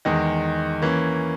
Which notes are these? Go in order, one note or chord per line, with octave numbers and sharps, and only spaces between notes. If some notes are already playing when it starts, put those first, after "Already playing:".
E2 D#3 G#3
E3 A#3 C#4